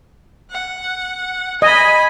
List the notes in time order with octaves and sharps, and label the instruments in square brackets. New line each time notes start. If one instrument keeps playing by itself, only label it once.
[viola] F#5
[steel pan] D#5 [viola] G#5 B5